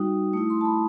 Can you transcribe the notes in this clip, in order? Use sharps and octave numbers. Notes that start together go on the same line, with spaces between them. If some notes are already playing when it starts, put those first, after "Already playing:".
Already playing: G3 D#4 F#4 D#6
A3 E4 D#6
C6
A5
B5